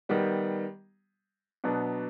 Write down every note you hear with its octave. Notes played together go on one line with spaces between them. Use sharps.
D#3 G3 B3
B2 F#3 B3 D4